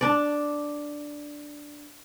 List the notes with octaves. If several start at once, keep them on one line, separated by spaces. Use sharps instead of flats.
D4 D5